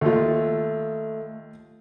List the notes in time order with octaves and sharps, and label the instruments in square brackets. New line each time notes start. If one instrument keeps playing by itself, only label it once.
[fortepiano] D#2 F4 [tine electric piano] A3